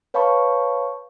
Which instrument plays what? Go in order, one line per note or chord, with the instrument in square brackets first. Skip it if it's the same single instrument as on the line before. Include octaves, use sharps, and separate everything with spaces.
[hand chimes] B4 C#5 F5 A5 B5 C#6